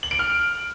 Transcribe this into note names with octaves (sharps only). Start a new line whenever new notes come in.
F#7
D7
F6